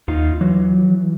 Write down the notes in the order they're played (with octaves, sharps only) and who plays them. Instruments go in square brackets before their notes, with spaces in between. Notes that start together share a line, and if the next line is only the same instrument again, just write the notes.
[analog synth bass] D#2 [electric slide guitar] D#4 F4 F5
[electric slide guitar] E3 [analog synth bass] F#3